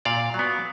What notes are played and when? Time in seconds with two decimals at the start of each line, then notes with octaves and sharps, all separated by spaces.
0.05 A#2 D5 F5
0.34 F#3 B3